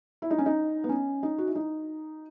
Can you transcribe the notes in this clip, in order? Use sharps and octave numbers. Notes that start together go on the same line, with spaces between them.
E4
D#4
C#4
D#4
B3
C#4
D#4
F#4
E4
D#4